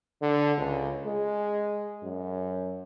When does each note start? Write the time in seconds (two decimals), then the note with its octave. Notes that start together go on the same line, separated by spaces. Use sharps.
0.21 D3
0.58 C#2
1.06 G#3
2.03 F#2